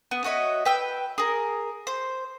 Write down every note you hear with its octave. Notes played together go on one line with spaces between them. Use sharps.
B3
F#4 C#5 D#5 E5
B4 G5 E6
G#4 A#4
C5